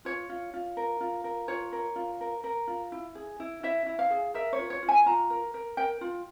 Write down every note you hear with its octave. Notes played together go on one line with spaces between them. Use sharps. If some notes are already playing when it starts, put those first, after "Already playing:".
F4 C#5
F4
F4
A#4
F4
A#4
F4 C#5
A#4
F4
A#4
A#4
F4
E4
G#4
E4
E4 E5
E4
F5
G#4
A#4 E5
C#5
F4
C#5
F4
G#5
F4 A#5
A#4
A#4
A#4 G5
F4